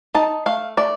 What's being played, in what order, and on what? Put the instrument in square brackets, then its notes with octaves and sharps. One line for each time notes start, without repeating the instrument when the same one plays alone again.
[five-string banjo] D#4 A5
A3 F5
A3 D5